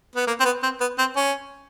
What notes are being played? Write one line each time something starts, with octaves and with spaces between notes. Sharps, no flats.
B3
A#3
C4
B3
C4
B3
C4
C#4